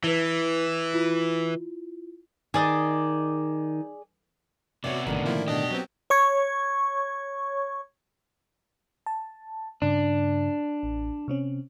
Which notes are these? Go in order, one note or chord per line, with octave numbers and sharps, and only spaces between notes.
E3 E4 B4
E4 F4
D#3 G#4 D5 D#5
C3 B3 F#4 C#5 D5 E5
G1 A2 D3 D#3
F3 A#3 E4
B2 D4 G4 D#5
F#3 B3 C4
C#5 C#6 G#6
A5
G2 C#3 D4
A1
C3 C4 C#4